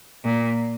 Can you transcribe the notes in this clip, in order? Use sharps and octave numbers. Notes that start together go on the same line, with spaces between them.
A#2